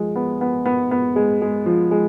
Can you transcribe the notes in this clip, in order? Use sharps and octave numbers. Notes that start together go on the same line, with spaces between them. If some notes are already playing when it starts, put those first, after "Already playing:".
Already playing: F3 G#3
B3
B3
B3
B3
G#3
G#3
F3
G#3